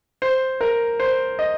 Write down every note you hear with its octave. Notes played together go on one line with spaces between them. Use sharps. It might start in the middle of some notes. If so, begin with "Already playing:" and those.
C5
A#4
C5
D#5